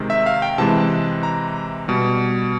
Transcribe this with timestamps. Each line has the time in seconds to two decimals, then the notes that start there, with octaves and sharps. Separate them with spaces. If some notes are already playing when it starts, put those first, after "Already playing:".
Already playing: C3 D#3 G#3
0.10 E5
0.26 F5
0.42 G5
0.58 C3 E3 G#3 A5
1.23 A#5
1.88 B2 G3